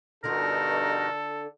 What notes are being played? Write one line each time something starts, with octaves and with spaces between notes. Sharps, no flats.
G2 B2 D3 D4 D#4 F4 A4 A#4